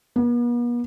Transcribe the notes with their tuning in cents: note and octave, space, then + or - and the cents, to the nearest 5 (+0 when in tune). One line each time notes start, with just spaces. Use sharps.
B3 -45